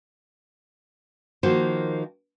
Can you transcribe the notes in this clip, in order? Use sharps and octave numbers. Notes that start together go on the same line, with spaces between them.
D#3 F3 A#3 F#4 C5